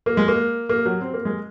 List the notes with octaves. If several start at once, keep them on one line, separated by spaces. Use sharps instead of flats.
A#3
G#3
A#3
A#3
F#3
C4
A#3
G#3